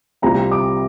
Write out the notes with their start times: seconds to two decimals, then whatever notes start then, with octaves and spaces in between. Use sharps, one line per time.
0.22 C2 C3 G3 C4 F4 A#5
0.51 D6